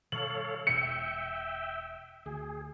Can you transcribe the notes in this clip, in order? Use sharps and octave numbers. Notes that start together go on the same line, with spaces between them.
B2 D#3 G3 A4 C#5 F5 F#7
E1 B2 E5 G5 C#7
D2 G#4